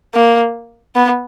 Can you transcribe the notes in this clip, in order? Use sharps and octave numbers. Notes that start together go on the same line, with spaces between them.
A#3
B3